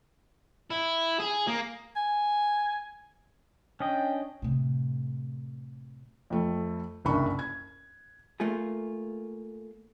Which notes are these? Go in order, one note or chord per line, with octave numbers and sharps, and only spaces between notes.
E4
G#4
A#3
G#5
C#4 D4 D#5 G5
A2 C3
F2 A3
F#1 C2 G2 B5 C#6
G#6
A3 A#3 F4 G#4